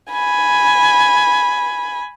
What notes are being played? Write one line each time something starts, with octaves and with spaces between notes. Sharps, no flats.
G#5 B5